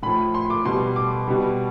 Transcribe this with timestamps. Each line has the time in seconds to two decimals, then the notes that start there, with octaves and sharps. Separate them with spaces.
0.03 A2 F3 B5
0.34 C6
0.50 D6
0.65 B2 G3 C6
0.96 D6
1.28 B2 G3